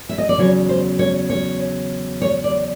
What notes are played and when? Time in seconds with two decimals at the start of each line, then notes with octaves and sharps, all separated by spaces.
0.09 E5
0.18 D#5
0.29 D5
0.38 E2 C#3 F#3 C#5
0.69 C5
0.99 C#5
1.30 C#5
2.22 C#5
2.44 D5